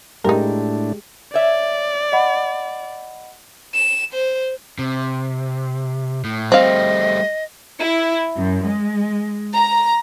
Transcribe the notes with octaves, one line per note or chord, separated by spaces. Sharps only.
A2 G#3 D4 D#4 G4 A#4
C#5 D5 E5
D#5 F#5 B5
E7
C5
C3
A2
G3 A3 C4 D#5 F5
E4
F#2
G#3
A#5